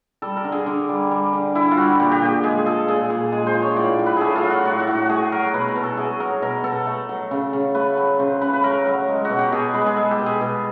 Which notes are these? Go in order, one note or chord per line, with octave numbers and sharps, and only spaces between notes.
G3 A4
A#4
D3
G#4
D3
G3
G3
D3
D3 E4
F4
G3 F#4
A#2 G4
G4
A#2 G#4
G#3 G#4
F3 A4
A#2 G#4
A#2 G#4
G#3 G#4
C5
F3
C#5
A2 D5
A2
B4
A3 G#4 A4
F4
F#3
F#4
A2 F#4
F#4
A2
F#4
A3 G#4
F#3 A#4
B2 B4
A#4
B2
A4
A3 G#4
F#3 A#4
B2 A#4
B2 A4
A3
F#3
C#3
C#3
A3 B4
F#3
C#3 C5
C#3 B4
B4
A3 A#4
F#3
G#3
F#4
B2
G4
B2 G#4
G#3 B4
G#4
G#3 A4
G4
B2
G#4
B2